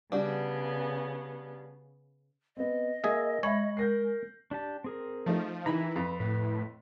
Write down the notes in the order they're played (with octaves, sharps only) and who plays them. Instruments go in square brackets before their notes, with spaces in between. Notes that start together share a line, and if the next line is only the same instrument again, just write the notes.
[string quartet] C#3 B3 [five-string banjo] G3 D4 F#4
[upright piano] B3 C4 [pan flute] D#5
[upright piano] A#3 [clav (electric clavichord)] G#4 E5
[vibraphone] G#3 [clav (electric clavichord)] C#5 [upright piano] E5 B5 F#7
[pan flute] A#4 [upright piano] G6 A#6 C7
[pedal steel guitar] D4 G4 A5
C4 G#4 A#4
[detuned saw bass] F3 [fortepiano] A3 D#4
[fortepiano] D#3 B5 [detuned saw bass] E3 [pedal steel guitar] E5 G#5 A#5
[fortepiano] F2 [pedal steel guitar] B4
[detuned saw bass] A2 [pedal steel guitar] B4